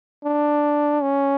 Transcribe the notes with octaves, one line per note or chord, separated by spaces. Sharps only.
D4
C#4